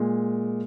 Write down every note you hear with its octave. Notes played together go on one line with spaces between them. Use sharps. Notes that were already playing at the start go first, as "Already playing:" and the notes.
Already playing: A#2 G#3